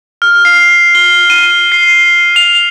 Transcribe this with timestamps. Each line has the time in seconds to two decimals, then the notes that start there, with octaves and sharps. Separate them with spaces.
0.22 F6
0.45 C7
0.95 G7
1.30 D#7
1.72 C7
2.36 F7